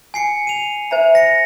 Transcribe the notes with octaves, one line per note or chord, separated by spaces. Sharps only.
G#5 C7 C#7
D#7 F7
C5 E5 A#5
A#6 C#7